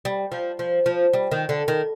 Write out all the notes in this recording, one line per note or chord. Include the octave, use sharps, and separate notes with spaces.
G3
F3
F3
F3
G3
D#3
D3
D#3